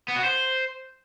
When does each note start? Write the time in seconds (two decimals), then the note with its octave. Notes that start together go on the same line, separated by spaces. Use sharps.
0.08 B3
0.16 F#4
0.24 C5